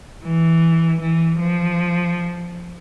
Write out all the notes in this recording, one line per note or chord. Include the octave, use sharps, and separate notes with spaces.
E3
E3
F3